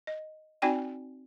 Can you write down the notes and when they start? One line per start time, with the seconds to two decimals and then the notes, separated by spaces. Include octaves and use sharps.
0.07 D#5
0.62 C4 D#4 F#4 D5 G5 G#5